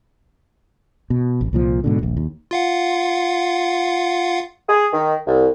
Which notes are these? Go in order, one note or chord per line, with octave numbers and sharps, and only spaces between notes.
B2
A1
C2 A#2 F3
G#2 B2 D3
D#1 A#1
D#2
F4 F5 F#5
G#4
D#3
C2